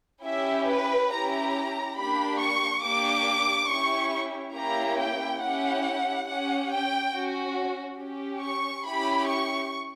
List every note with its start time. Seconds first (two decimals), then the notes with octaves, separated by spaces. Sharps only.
0.24 C#4 E4 G4 E5
0.68 B4
1.11 C#4 E4 G4 A#5
1.96 A#3 D4 G4 B5
2.39 C#6
2.82 A#3 D4 G4 D6
3.68 C#4 E4 G4 C#6
4.55 A#3 C#4 E4 G4 A#5
4.98 G5
5.41 C#4 E4 G4 F#5
6.27 C#4 G4 F#5
6.70 G5
7.13 C#4 F#4
8.00 C#4 G4
8.43 C#6
8.85 C#4 E4 G4 B5
9.29 C#6